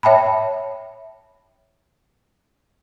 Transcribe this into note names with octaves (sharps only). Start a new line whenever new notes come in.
C#5 E5 G5 A5 B5